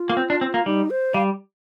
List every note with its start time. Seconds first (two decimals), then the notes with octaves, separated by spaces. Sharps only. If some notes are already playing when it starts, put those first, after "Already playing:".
Already playing: F4
0.10 A#3
0.17 C4
0.30 D4
0.41 C4
0.54 A#3
0.66 G3 D#4
0.90 C5
1.14 G3 F5